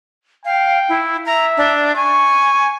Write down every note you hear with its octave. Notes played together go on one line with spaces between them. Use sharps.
F5 G5
E4
E5 A#5
D4
G#5 C#6